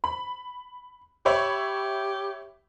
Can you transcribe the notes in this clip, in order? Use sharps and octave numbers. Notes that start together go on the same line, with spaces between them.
B5
G4 C#5 E5 B5